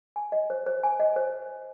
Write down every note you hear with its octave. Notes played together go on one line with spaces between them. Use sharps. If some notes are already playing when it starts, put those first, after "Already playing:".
G#5
D#5
C5
C5
G#5
D#5
C5